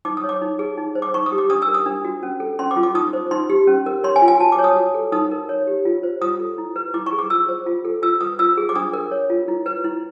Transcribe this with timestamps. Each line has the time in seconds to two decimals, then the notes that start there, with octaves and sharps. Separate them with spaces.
0.05 D#4 D6
0.17 D#6
0.24 C#5
0.29 D6
0.42 D#4
0.59 G#4
0.77 D#4
0.95 C5
1.02 D6
1.13 D#4 C#6
1.26 D#6
1.32 G4
1.38 D6
1.50 D4 D#6
1.62 E6
1.68 A#4
1.74 D#6
1.86 D4
2.05 F#4
2.23 C#4
2.40 A4
2.59 C#4 C6
2.71 D6
2.77 F4
2.83 D6
2.94 D#4 D#6
3.13 C5
3.31 D#4 C6
3.50 G4
3.67 C#4
3.86 A#4
4.04 C#5 C6
4.16 G#5
4.22 F4
4.28 G#5
4.40 F#4 A5
4.52 D6
4.58 C#5
4.64 D#6
4.76 F#4
4.94 A4
5.12 D#4 D#6
5.31 A#4
5.49 C#5
5.67 G4
5.85 F4
6.03 C5
6.22 F4 D#6
6.40 A4
6.58 E4
6.76 B4
6.94 E4 D6
7.06 C#6
7.12 G#4
7.19 D6
7.30 F4 E6
7.49 C5
7.66 F4
7.85 A4
8.02 F4 E6
8.21 B4 D#6
8.39 F4 E6
8.57 G#4
8.69 D6
8.75 D4 D#6
8.93 A#4
9.11 C#5
9.30 F4
9.48 E4
9.66 B4
9.84 E4